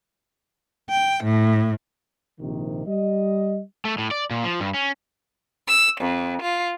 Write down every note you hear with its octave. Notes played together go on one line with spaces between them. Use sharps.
G5
A2
A#1 C3 D#3
G3 D#5
A3
A2
D5
A#2
F3
G2
C#4
E6
F2
F4